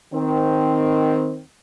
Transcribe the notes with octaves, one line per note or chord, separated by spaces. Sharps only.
D#3 C4